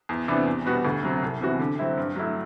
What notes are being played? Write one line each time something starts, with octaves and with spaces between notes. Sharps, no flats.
E2
C3 E3 B3 D4
E2
B2 G3 B3 F#4
D2
C3 F#3
C2
C3 E3 B3 F#4
D3
F#3 C4 E4
G2
F#3 A3 E4